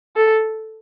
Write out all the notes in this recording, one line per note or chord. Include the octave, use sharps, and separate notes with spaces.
A4